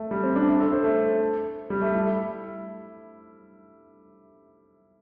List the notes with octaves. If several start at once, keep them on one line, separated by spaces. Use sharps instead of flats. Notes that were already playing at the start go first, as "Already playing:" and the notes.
Already playing: A3
G3
C4
D4
E4
A4
C5
A3
G3
A3
E4